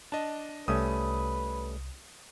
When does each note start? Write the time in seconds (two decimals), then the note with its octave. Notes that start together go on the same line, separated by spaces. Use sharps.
0.12 D4 D#5 A5
0.68 C2 G3 A3 C#4 B4 D#6